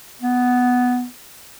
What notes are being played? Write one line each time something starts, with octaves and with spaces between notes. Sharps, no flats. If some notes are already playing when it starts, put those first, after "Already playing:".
B3